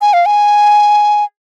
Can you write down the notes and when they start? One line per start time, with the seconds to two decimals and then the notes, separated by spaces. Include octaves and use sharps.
0.01 G#5
0.13 F5
0.26 G#5